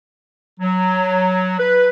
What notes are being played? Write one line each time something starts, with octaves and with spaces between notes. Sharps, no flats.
F#3
B4